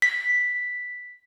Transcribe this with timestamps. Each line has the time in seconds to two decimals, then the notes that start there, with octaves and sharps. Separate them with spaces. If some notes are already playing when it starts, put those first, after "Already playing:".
0.02 B6